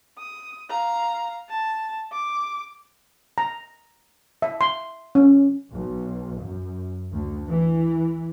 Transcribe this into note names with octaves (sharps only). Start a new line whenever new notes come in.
D#6
F5 A#5
A5
D6
A#5
E5
C6
C#4
B1
F#2
D2
E3